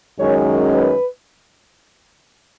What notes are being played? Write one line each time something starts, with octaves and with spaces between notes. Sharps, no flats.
F#2 D#3 G#3 C#4 C#5
B4